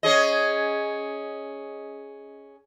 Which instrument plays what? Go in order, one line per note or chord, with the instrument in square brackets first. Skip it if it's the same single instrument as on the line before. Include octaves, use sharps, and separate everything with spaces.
[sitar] C#4 G#4 D#5